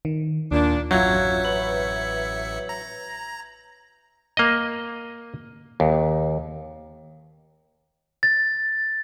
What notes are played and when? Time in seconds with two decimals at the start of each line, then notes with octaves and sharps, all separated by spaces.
0.05 D#3
0.51 D#2 A#2 D4
0.91 A1 F#2 F#3 F4 E5 G6 G#6 C#7
1.45 B4 C#5 F#7
2.69 A#5
4.37 A#3 D#5
5.80 D#2
8.23 A6